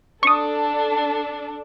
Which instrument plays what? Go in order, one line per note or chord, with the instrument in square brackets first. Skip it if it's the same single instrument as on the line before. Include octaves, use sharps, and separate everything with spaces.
[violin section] D4 A4 [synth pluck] C#6 D#6